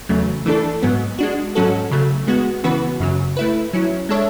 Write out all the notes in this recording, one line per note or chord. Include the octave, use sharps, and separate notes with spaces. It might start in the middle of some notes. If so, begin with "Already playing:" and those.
E2 C#3 F#3 A3
E3 A3 D4 A4
G#2 F#3 B3
G#3 D4 F#4
G#2 F#3 C#4 F#4 A4
C#3 F#3 A3
G#3 B3 F#4
C#3 E3 B3 F#4 B4
F#2 C#3 F#3
A3 E4 B4
F#3 C#4 E4
G#3 D4 A4 C#5 E5